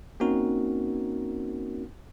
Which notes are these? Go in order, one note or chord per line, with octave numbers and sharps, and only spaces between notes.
A#3 C4 C#4 D#4 F#4 A#4